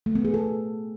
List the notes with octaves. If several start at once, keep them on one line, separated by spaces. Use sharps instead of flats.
A3
B3
G#4
A4